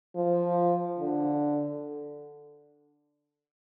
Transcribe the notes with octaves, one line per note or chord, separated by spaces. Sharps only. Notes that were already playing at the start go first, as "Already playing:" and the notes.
F3
D3